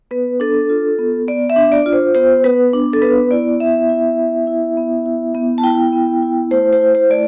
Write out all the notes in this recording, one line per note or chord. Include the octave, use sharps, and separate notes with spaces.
B3 B4
D4 A4
F4
B3
B3 D5
E5
D4
D5
F4
C5
B3 C5
B3 B4
D4
A4
B3 B4
E4 D5
B3 E5
E4
B3
E4
B3
E4
B3
A5
E4 G5
B3
E4
A3 C5
C5
E4
C5
A3 D5